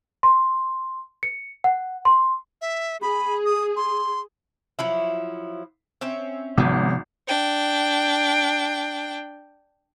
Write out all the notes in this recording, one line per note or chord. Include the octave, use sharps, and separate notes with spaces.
C6
C#7
F#5
C6
E5
G#4 B5
D#6
C6
F3 F#3 E4
C4 C#4 E5
G#1 C3 F3 B3
D4 G5